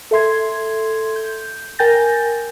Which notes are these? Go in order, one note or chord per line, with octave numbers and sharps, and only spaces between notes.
A4 E5 C6 G#6
G6
A#4 G5 G#5 G6 A6 A#6